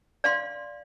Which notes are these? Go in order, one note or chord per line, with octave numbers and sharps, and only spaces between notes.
D5 F5 C6